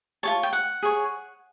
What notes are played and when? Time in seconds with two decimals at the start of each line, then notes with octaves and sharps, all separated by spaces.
0.23 F4 G#4 C#5 A5
0.43 G5
0.53 F#5
0.83 G#4 C#5